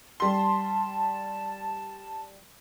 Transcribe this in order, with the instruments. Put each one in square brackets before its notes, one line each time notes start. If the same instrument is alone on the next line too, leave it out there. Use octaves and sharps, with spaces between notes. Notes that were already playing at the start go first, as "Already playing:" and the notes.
[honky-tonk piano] G3 C6 [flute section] A5